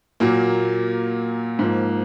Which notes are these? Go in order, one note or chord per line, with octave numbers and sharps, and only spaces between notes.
A#2 F#3 A#3
G#2 F3 A#3